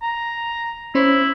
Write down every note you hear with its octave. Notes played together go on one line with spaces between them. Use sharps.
A#5
C#4 E4 C5 C#5